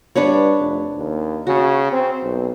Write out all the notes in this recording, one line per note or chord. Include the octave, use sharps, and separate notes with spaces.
G2 D4 B4 C#5
F1
D#2
C#3 F#4
C4
B1